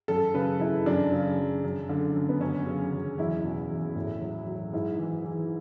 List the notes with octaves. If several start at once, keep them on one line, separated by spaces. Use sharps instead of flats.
F#2 A4
C#3 B4
F#2 E4
F#2 D4
C#3
F#2
F#2
D3
F#2
B3
F#2 C#4
C#3
F#2
E2 E4
B2
E2
A2
F#3
F#3
G#2 E4
E3
E3